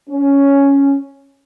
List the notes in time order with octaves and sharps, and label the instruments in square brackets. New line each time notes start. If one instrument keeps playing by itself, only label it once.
[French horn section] C#4